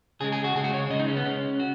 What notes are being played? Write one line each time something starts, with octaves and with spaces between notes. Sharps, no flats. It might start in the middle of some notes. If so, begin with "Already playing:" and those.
C#3 G#3 G#4
G#4
F#4
C#3 G#3 G#4
F#4
C#5
C#3 G#3 D#5
D#4
C#4
B3
C#3 G#3 C#4
F#4